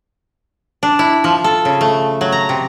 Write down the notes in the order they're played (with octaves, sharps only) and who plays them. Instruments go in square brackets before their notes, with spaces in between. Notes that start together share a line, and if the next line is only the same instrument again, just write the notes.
[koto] D4
E4
F3
A4
C#3
A3
F#3
A#5
C3